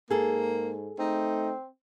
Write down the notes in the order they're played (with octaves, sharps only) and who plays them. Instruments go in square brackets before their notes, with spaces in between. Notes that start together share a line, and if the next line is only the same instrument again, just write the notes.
[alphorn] G#2 [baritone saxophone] A#3 [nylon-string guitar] G#4 A4
[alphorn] A3 [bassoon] C4 [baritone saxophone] D#4